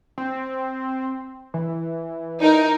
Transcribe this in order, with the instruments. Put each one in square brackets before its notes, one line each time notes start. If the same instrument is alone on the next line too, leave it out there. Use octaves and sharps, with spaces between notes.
[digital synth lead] C4
E3
[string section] D#4 A#4